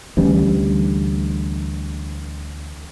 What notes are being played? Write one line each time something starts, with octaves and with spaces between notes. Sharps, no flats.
D2 E3 G3 C#4